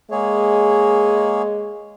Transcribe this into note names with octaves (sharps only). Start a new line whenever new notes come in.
G#3 A#3 G#4 C#5